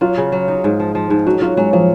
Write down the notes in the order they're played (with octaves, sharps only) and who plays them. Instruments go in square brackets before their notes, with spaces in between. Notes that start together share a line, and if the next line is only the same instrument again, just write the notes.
[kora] F#3 [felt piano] F4
[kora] C#3
F#3
D#4
G#2
F3
F3
G#2
[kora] F#3 [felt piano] F#4
[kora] F#3 [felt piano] F4
[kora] F#3 [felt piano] G#3
[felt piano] F3 [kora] F#3